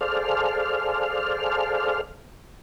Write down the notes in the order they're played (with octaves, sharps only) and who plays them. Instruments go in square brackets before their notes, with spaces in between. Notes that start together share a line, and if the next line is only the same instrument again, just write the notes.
[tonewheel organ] G#4 A4 C5 D5 F5 F6